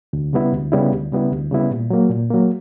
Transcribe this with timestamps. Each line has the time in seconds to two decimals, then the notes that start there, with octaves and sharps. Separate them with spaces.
0.13 D2
0.33 C#3 G3 B3 E4
0.52 D2
0.72 C#3 G3 B3 E4
0.92 D2
1.12 C#3 G3 B3 E4
1.32 D2
1.51 C#3 G3 B3 E4
1.71 A#2
1.90 F#3 A#3
2.10 A#2
2.30 F#3 A#3